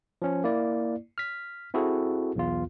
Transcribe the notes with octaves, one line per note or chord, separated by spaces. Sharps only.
F3 C#4
A#3 E4 D5
F6 B6
C4 E4 F#4 G#4 A4
B1 E2 F4